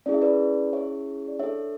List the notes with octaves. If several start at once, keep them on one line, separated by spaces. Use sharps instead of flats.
C#4 E4 G#4 D5
E5
B4 D5
C#5 E5
D5
D4 A4 C#5 E5